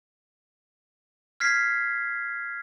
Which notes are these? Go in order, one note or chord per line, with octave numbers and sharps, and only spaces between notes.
F6 G#6 B6 C7